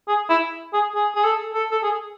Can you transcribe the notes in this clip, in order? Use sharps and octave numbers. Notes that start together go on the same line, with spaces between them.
G#4
E4
G#4
G#4
G#4
A4
A4
A4
G#4